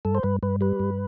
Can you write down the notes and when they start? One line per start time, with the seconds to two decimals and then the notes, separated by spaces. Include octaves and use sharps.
0.05 G2 A4
0.15 C5
0.23 G2 B4
0.43 G2 B4
0.61 G3 B4
0.80 G2